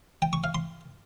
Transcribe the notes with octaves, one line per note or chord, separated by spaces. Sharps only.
G5
C#6
F5
C6